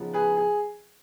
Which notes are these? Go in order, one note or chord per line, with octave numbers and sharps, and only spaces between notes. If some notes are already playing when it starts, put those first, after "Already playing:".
Already playing: C#3 F3 B3 D#4
G#4 B4
G#4